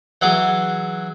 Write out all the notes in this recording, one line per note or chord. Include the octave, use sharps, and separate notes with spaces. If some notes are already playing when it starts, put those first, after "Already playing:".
E3 F#3 G#4 D6